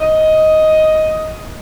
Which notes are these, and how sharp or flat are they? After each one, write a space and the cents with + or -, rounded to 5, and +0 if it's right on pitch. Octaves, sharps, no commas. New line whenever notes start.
D#5 +10